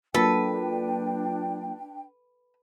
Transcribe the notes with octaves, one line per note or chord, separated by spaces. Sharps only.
F#3 A#3 D4 F4 A4 B4 G5